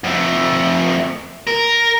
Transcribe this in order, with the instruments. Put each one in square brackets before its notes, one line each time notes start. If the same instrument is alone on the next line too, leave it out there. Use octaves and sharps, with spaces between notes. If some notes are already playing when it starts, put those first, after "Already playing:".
[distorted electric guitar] F2 A3
A#4